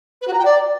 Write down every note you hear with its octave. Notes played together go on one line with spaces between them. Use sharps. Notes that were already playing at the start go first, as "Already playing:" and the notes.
B4
F#4
A#5
G5
D5